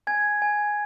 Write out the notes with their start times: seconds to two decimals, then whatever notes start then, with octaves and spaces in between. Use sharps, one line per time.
0.07 G#5 G#6
0.42 G#5